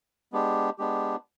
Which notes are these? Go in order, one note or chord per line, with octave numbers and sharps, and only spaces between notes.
G#3 B3 D4 G4
G#3 B3 D4 G4